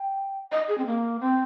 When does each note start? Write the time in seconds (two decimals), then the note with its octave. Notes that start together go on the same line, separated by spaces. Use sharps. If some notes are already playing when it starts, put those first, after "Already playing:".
Already playing: G5
0.52 D#5
0.68 G#4
0.78 C4
0.86 A#3
1.20 C4